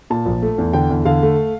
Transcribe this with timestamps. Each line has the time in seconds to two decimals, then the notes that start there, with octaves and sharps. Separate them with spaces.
0.10 A#2 A5
0.26 A#1
0.42 A3
0.58 E2
0.73 D3 G5
0.90 E2
1.05 D3 F5
1.22 A3